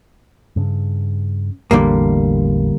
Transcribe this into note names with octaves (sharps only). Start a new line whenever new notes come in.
G2 C#3
A1 E2 A2 D3 G3 A#3